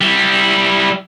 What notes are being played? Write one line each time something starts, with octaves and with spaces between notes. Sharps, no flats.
G3 E4